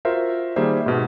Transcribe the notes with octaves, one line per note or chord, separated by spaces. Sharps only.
F4 F#4 A#4 C5 E5 F5
D#3 G3 A#3 G#4 C5 E5
G#2 B2